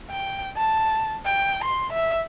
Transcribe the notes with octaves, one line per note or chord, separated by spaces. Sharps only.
G5
A5
G5
C6
E5